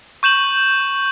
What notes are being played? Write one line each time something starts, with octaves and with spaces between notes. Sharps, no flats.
C#6 G6 E7 F#7